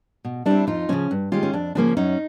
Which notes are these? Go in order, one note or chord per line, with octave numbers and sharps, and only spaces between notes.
B2
G3 C4 D4 E4
F2 D#4 F4
C#3 F3 C#4
G2
D#3 G#3 C#4 F4 G4
C#4
F2 D4
C#3 F3 A#3 C#4 D4
F#2 C#4 D#4